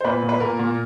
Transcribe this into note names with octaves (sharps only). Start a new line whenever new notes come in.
C5
A#2 B4
A#2
B4
A#2 A#4
A#2